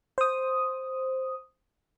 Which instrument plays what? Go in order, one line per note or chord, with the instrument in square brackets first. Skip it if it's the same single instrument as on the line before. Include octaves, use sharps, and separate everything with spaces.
[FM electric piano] C5 D#6